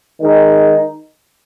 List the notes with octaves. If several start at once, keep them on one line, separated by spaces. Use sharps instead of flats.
D#3 G#3 D#4